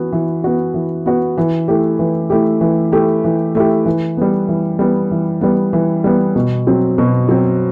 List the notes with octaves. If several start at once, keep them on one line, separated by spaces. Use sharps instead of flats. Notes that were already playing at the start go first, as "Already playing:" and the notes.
Already playing: E3 B3 F#4
E3
B3 F#4
E3
B3 F#4
E3
A3 E4 G4
E3
A3 E4 G4
E3
A3 E4 G4
E3
A3 E4 G4
E3
G3 B3
E3
G3 B3
E3
G3 B3
E3
G3 B3
B2
F#3 C4
B2
F#3 C4